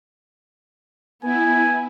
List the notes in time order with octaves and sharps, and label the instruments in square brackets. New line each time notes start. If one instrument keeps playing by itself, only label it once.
[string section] B3 [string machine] E4 [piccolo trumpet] G#5